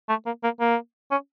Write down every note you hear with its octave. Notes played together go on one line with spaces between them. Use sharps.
A3
A#3
A#3
A#3
C#4